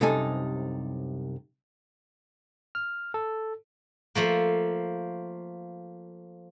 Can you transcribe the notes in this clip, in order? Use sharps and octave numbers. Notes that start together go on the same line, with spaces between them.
C2 F#2 C3 D#4 A4 G#5
F6
A4
F3 A3 A#3